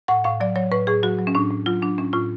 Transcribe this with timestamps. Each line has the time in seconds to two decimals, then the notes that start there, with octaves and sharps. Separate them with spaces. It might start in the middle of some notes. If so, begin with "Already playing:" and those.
0.08 A2 F#5
0.24 A2 F5
0.40 F#3 D5
0.56 F#3 C#5
0.72 A2 B4
0.87 A2 G#4
1.03 F#3 F#4
1.18 F#3
1.27 C#4
1.35 A2 D4
1.51 A2
1.66 F#3 F4
1.82 F#3 D4
1.98 A2 C#4
2.13 A2 F4